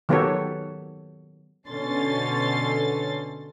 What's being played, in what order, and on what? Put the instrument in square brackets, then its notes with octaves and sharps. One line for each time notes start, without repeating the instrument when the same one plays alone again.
[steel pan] D#3 F#3 B3 G4 A4 C#5
[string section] B2 D3 C#4 A4 C6 A6